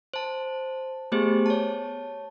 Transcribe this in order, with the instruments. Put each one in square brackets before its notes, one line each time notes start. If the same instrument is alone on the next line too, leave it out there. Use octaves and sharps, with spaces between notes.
[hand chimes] C5 A5
A3 B3 G4 G#4 C5
C#5 A5